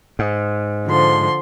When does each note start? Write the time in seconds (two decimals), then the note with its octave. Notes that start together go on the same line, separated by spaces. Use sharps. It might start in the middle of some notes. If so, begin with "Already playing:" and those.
0.19 G#2
0.86 D3 F3 C6